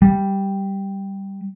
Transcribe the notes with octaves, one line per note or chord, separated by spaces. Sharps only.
G3